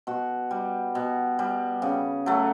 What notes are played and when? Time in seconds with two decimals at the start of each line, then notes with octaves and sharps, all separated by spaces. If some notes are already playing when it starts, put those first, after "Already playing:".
0.07 B2 F#4
0.51 G3
0.95 B2
1.39 G3
1.82 C#3
2.26 F#3 A3